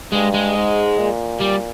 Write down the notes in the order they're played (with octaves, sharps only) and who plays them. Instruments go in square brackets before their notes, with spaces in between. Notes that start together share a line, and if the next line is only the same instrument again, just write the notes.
[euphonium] G2 [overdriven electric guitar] G#3
[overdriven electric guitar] G#3
[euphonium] G#2
A#2
[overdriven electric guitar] G3